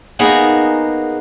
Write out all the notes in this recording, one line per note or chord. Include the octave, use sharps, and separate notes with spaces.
A#3 B3 D#4 F#4 G#4